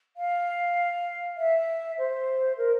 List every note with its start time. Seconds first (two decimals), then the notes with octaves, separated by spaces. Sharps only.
0.16 F5
1.37 E5
1.98 C5
2.57 A#4